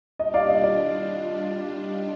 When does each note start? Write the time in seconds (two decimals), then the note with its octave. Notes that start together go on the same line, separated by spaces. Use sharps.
0.19 G3 D4 F4 D#5
0.34 D5 F5
0.49 D#5
0.63 D5